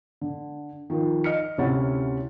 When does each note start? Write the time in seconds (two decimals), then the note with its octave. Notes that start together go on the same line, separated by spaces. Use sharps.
0.21 D3
0.90 D#3 F3 A#4
1.24 D#5 F6 C#7
1.58 D2 C3 C#4 E4 F#5 A6